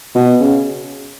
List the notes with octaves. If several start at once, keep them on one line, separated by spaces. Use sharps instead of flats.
B2
C#3